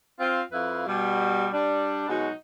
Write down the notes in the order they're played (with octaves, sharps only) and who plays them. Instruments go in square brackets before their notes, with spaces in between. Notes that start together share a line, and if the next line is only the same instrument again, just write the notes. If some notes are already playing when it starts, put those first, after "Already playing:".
[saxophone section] C4 F4
F2 E4 B4 F5
B2 G3
G3 D4
B2 F#3 G#3 D#4 F#4